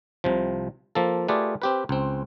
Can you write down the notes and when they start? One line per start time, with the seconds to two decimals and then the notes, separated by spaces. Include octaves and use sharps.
0.24 C2 C3 F3
0.95 F3 A#3 A4
1.28 A3 F4 G4 G#4 B4 D5
1.62 C4 G4 B4
1.89 C#2 C4